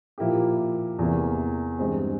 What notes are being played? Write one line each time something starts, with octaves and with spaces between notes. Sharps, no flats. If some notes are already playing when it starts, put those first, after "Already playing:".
A#2 F3 A#3 E4 G4
E2 C3 E3 A#3
G2 E3 G#3 C4